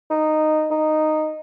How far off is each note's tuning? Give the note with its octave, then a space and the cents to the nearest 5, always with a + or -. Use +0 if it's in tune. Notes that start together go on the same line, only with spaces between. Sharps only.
D#4 -10
D#4 -10